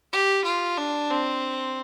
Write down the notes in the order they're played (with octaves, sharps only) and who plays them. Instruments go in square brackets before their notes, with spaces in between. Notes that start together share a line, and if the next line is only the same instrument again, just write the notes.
[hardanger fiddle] G4
F4
D4
C4